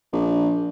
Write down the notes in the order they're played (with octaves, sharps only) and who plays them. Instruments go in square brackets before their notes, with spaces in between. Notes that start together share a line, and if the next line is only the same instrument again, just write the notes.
[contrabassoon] A#1